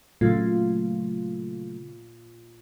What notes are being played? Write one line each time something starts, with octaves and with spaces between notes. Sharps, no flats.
A#2 C#3 F#3 A3 F4